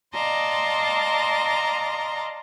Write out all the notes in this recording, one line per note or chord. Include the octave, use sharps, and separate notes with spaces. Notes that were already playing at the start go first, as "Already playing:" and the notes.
D5 D#5 F5 A5 A#5 C6